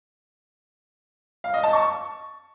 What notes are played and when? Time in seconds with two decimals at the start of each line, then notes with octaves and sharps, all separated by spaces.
1.44 F5
1.54 D#5
1.63 A5
1.73 C#6